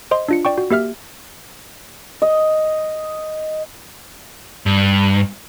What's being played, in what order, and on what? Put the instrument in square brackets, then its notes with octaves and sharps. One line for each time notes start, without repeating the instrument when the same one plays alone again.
[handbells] C5 D#5 C6
D4 F4 C#7
D5 G5 C#6
F#4
A#3 G4 E5 F6
[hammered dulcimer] D#5
[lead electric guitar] G2